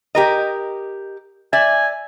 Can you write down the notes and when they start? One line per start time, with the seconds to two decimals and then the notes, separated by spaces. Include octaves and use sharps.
0.15 G4 A#4 D#5
1.53 D5 E5 G#5